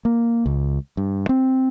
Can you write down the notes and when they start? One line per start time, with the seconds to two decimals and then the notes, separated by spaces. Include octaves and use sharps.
0.05 A#3
0.46 C#2
0.97 G2
1.29 C4